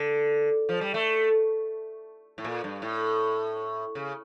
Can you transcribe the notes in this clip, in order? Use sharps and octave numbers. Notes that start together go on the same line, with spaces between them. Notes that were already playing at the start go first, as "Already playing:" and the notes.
Already playing: D3
F3
G3
A3
A2
A#2
G2
A2
C#3